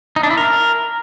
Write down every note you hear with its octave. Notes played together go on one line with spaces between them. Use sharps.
D#4
D4
E4
A#4